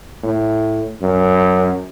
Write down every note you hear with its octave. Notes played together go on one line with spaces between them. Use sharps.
A2
F#2